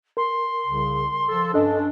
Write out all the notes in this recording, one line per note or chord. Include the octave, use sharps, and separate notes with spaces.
A#4 C6
C2 C#3
F3 A4
G2 C#4 D4 A4 D#5